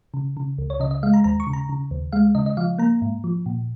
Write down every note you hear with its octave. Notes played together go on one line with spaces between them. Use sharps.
C#3
C#3
C#2
C#5
C#3 D#5
D#5
G#3 F5
A#5
D#2 A#5
C#6
C#3
A#5
C#3
D#2
G#3 F5
C#3 D#5
D#5
F3 F5
A#3 A#5
G#2
F3
A#2